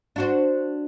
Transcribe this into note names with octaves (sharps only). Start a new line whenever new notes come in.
D4 F#4 C5